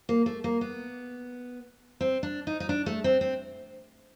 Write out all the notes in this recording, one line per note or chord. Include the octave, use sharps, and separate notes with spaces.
A#3
A3
A#3
B3
C4
D4
D#4
D#4
D4
A3
C4
C4